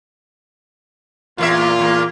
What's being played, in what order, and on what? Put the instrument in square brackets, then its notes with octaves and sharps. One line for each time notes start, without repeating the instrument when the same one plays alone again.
[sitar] E2 A#3 E5 [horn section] A#2 F4
[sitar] E2 A#3